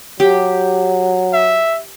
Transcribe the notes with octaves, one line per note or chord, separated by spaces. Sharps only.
F#3 G4
E5